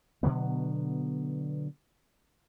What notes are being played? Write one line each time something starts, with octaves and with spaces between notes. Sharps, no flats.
B2 D3 F#3 B3